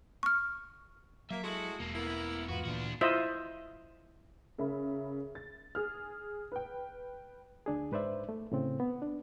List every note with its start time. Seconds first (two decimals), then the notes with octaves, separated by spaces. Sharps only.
0.23 C#6 F6
1.30 F#3 A#3 E5
1.44 G#3 A3 E4 F#4
1.80 E1 A#3 A4
1.95 A#3 B3 E4 A#4
2.49 E2 G#2 B3 F4 F#4
2.65 D2 A#2 E3 D4 F#4
3.01 E4 F4 C5 D#5 E5
4.58 C#3 A#4 E5 B5
5.35 A6
5.75 G#4 F6
6.52 B4 G5
7.66 D2 D4 G#4
7.92 G#2 B4 C5 D5 E5
8.29 A3
8.52 A2 C#3 C4
8.80 B3
9.02 D4